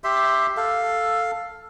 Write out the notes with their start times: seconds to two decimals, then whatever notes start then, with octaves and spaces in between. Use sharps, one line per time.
0.04 G4 E5 C6
0.57 A4 F5